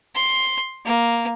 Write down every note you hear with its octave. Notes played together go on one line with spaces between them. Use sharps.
C6
A#3